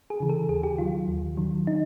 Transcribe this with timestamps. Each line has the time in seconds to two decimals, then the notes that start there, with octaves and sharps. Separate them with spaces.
0.10 G#4
0.20 C#3 E3
0.29 A4
0.49 D#2 G#4
0.63 G4
0.78 D#3 F#3 F4
1.08 D#2
1.37 D#3 F#3
1.67 D#4